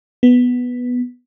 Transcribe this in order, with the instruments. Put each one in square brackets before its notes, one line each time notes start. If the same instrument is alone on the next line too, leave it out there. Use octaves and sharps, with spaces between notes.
[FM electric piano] B3